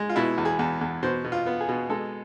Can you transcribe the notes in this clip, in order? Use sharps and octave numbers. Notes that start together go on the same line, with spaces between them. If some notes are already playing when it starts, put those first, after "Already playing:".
Already playing: G#3
F4
B2 E4
E2
G#4
E2
E2
B2 C5
B2
F4
B3
G#4
B2
G#3 A4